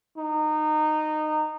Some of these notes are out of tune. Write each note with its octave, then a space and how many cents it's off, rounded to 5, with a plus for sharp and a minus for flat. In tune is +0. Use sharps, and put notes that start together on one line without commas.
D#4 -20